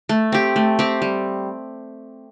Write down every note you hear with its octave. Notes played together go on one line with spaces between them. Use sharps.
A3
C4 G4
A3
C4 G4
G3